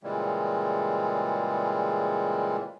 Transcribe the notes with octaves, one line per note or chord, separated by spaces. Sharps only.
A#2 C#3 E3 G3 G#3